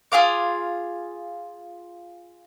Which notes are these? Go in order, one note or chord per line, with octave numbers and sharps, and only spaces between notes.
F4 G#4 F5 D6